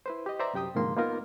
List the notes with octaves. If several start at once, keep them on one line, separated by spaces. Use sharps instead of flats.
E4 B4 C5
G4 D#5
B4 C5 D5 E5 A#5
C2 F#2 G4 G5 D#6
C2 G#2 D3 F3 A#3 C6
A#3 B3 D#4 F4 A#4